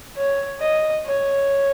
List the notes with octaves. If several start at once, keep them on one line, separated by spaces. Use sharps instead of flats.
C#5
D#5
C#5